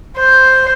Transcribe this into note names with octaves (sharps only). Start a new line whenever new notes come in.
C5